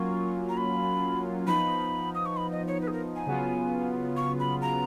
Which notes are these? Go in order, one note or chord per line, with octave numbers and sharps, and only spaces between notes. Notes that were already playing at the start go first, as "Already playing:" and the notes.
Already playing: F#3 A#3 C#4 F4 C#6
A#5
B5
F3 B3 D#4 B5
D#6
C#6
B5
D#5
C#5
B4
G#4
A#4
G#5
C#3 F#3 B3 F4
C#6
B5
A#5